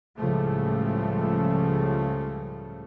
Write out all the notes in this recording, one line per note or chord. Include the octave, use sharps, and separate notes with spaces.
C#2 A2 C#3 F3 G3 A3